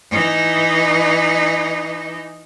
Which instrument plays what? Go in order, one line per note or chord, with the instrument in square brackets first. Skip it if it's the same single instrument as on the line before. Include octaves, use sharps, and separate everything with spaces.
[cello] E3 D#4